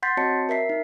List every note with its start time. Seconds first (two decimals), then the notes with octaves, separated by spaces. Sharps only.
0.03 F#5 C6 G6 A6 B6 C7
0.17 C4 F#4 C#5 D#5 A5 C#7
0.49 A#4 E5 B6 C7
0.69 D#4